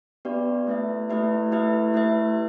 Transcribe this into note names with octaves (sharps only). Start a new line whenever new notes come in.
B3 D4 G4 B4 D5
A3 E4 G4 B4 E5
A3 E4 G4 B4 E5
A3 E4 G4 B4 E5
A3 E4 G4 B4 E5